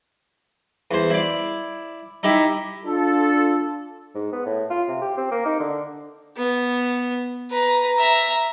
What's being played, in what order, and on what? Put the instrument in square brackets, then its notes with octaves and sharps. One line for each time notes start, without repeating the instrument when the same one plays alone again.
[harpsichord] E2 C5
E4 D5
D#4 E4 G4 E5
[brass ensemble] D4 F4 A4
[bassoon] G#2
B3
A2
F4
C3
G4
C4
A#3
D#4
D3
[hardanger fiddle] B3
B4 A#5
E5 A#5